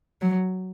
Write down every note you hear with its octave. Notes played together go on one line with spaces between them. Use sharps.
F#3